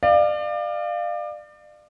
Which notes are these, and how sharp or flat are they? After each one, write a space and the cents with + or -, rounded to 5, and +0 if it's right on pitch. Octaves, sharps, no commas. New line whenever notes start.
D5 +35 F5 -5